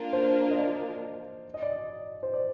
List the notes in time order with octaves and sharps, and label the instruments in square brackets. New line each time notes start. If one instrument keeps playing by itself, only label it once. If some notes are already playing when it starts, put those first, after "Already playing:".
Already playing: [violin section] A#3 D4 F4 A#4
[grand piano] C5
D#5
D5
D#5
D5
D#5
C5
D5